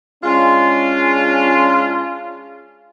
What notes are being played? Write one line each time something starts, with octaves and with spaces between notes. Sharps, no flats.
G#3 C#4 D4 F4